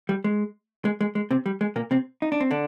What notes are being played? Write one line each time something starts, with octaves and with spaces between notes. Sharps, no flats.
G3
G#3
G#3
G#3
G#3
C3 C4
G3
G#3
A#2 A#3
C3 C4
D#4
D4
C4
D3 D4